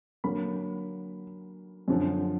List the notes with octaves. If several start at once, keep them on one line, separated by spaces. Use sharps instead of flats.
D3 F#3 A#3 B5
F#2 D3 F3